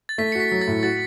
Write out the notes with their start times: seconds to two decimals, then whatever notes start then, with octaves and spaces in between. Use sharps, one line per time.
0.09 A6
0.18 A3 B6
0.32 C#7
0.35 F#4 B6
0.51 F#3
0.61 A6
0.68 A2
0.83 F#4 A6